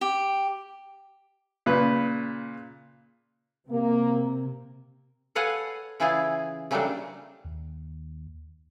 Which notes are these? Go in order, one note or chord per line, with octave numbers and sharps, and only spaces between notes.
G4
A#2 C#3 B4
C3 A#3
A4 B4 C#5 F5 F#5 G#5
C#3 E3 E4 F4 G#4 F5
C#3 F#3 G3 A3 A#3 D4
D#2